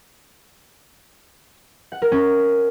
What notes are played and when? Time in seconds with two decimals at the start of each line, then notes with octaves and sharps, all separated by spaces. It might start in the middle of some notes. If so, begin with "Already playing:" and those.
1.92 F#5
2.02 A#4
2.12 C#4